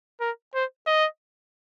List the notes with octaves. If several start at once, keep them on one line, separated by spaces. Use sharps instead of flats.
A#4
C5
D#5